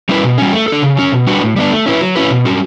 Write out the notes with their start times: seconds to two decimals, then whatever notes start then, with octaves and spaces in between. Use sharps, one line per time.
0.09 G3 C#4 E4 B4
0.23 B2
0.38 G3 C#4
0.53 A3
0.68 D4 A4
0.82 C#3
0.97 F#3 C#4
1.12 B2
1.27 G3 D4 F#4 B4
1.42 A2
1.56 G3 B3 D4
1.71 A3
1.86 C#4 E4 B4
2.01 F#3
2.16 C#4 E4 B4
2.30 B2
2.45 G3 C#4 F#4